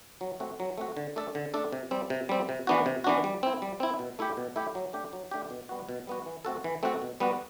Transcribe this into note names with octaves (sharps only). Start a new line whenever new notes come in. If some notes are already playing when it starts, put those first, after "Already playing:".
F#3
A3 C4 F#4
F#3
A3 C4 F#4
D3
A3 D4 A4
D3
A3 D4 A4
C3
G3 C4
C3
G3 C4
C3
E3 B3 D4 F#4
C3
E3 B3 D4 F#4
G3
C4 E4
G3
C4 E4
B2
A3 E4 G4
B2
A3 E4 G4
F#3
A3 D4 G4
F#3
A3 D4 G4
B2
G3 B3 F#4
B2
G3 B3 F#4
E3
A3 C4 F#4 A4
E3
A3 C4 F#4 A4
B2
G3 B3 F#4